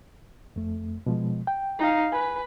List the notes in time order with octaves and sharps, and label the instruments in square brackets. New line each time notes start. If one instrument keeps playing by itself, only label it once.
[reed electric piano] F2 A3
B2 F3 G#3
G5
[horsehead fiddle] D#4 F5
[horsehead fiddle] B4 [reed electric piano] G#5